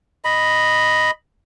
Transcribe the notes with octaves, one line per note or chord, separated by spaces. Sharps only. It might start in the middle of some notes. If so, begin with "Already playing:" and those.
D#5 B5